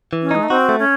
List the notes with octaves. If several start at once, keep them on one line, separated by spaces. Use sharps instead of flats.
E3
C#4
G#3 D#4
A3
C4 F#4
A3
C#4